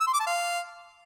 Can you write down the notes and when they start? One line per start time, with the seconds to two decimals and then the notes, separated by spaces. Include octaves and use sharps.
0.01 E6
0.07 C6
0.14 D6
0.20 A5
0.27 F5